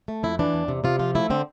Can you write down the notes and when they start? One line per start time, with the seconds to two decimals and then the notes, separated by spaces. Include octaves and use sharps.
0.08 A3
0.23 F2 E4
0.39 E3 D4
0.54 E2
0.68 C3
0.84 C3 F4
0.99 F3 F4
1.15 A3 E4
1.30 D3 C4